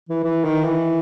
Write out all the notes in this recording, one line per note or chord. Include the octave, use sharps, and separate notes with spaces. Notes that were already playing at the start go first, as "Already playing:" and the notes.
E3
E3
D#3
E3